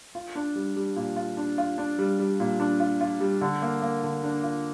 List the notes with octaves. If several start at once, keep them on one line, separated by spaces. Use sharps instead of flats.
F4
D4
G3
G3
A#2
F4
D4
F4
D4
G3
G3
A#2
D4
F4
F4
G3
D3
A#3
A#3
D3
D4
F4